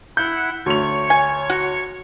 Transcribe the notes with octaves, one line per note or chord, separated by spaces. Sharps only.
E4 F#5 G6
D2 C#5 C#6 F7
G#5
F#4